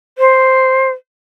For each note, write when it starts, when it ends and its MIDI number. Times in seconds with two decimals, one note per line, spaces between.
0.18 0.88 72